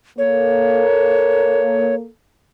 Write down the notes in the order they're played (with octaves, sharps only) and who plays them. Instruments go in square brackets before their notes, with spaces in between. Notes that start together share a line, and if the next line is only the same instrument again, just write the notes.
[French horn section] A#3 A4 [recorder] C#5